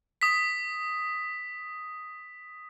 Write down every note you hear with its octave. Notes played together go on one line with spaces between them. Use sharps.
D#6 B6